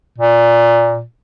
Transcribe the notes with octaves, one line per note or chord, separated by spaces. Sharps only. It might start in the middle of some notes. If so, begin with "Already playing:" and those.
A#2